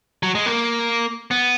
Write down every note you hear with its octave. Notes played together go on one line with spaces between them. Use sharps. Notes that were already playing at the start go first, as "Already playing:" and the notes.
F#3
G#3
A#3
B3